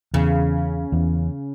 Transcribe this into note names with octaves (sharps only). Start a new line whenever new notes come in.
E2 C#3
E2